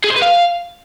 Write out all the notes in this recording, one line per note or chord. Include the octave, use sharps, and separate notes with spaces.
G#4
C5
B4
F5